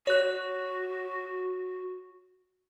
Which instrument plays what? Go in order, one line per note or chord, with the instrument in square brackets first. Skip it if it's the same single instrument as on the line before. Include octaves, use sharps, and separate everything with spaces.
[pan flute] F#4 [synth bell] C#5 F#6